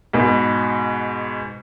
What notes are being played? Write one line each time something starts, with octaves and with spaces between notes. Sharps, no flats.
G#2 B2